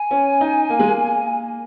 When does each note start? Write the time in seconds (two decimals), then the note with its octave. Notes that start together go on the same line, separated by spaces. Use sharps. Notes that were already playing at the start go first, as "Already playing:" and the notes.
Already playing: G#5
0.11 C#4
0.41 D#4
0.70 A#3
0.79 G#3
0.88 A#3